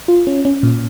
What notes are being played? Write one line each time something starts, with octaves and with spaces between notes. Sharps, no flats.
F4
C#4
C#4
A#2